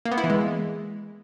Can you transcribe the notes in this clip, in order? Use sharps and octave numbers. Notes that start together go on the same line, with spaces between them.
A#3
B3
E4
E3
G#3